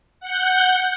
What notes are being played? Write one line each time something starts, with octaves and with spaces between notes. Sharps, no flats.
F#5 G6